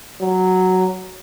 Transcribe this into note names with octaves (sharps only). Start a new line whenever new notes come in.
F#3